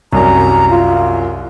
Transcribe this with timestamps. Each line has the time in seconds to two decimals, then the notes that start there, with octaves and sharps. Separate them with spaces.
0.13 C2 F#2 A#5
0.70 F4